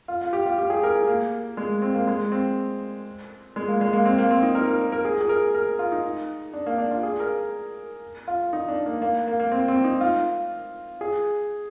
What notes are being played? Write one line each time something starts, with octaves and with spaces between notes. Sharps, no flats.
F4
F4
G4
F4
G4
G#4
A#4
G#4
A#3
G#3
C4
A#3
G#3
C4
G#3
A#3
G#3
A#3
C4
A#3
C4
D#4
A#4
A#4
A#4
G#4
G#4
A#4
A#4
F4
D#4
D4
A#3
D4
F4
G#4
A#4
F4
D#4
D4
A#3
A#3
A#3
A#3
C4
C4
D#4
F4
G#4